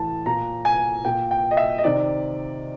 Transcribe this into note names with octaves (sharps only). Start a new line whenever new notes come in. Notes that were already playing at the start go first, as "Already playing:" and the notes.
Already playing: A2 E3 A5
A#2 A#5
G#5
A#2 G5
G5
D#5
E5
D#5
C3 D#3 D5